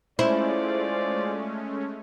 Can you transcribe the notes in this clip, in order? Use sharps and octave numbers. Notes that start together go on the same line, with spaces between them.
G#3 A3 C#4 E4 F4 G#4 C5 D5